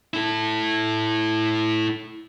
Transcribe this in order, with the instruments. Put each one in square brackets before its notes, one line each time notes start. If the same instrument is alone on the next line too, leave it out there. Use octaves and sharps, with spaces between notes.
[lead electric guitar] E4 A4